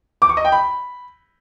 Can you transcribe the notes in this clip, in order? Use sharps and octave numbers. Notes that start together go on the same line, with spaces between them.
D6
C#6
D#5
G5
B5